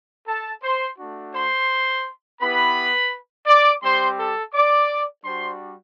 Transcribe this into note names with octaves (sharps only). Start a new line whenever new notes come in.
A4 A5
C5 C6
A3 D4 F#4
C5 C6
B3 E4 G4 B4 B5
D5 D6
G3 C4 G4 C5 C6
A4 A5
D5 D6
G3 D4 F#4 C5 C6